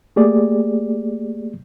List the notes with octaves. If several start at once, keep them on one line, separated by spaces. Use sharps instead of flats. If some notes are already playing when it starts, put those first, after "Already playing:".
A3 A#3 G4 G#4 D5